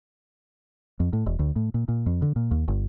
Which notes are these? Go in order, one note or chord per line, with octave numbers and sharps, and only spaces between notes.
F2
A2
E1
D2
A2
A#2
A#2
F2
D3
A#2
D#2
G1